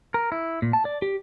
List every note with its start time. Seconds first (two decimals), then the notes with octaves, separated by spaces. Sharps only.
0.14 A#4
0.32 E4
0.62 A#2
0.73 A5
0.85 D5
1.02 G4